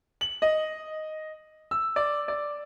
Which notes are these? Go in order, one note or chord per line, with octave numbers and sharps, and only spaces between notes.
F#7
D#5
E6
D5
D5